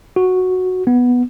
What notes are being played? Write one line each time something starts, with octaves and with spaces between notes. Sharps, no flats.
F#4
B3